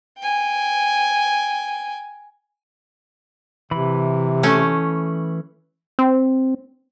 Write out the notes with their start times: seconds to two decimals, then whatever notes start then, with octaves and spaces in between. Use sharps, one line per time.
0.18 G5 G#5
3.71 C3 E3 B5
4.43 A3 C#4
5.99 C4